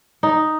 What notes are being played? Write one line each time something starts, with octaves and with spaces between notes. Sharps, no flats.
D#4